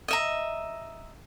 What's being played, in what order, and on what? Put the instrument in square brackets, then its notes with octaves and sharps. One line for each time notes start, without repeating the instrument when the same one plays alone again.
[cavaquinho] D#5 E5 A#5